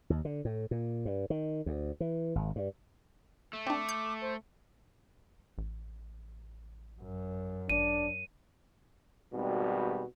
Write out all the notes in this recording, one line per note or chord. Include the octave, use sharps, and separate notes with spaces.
D#2
D3
A2
A#2
G2
D#3
D2
E3
G#1
G2
A3
C4 D4 D6
G6
C5
A1
F#2
G#1 D4 D#7
G#1 B2 G3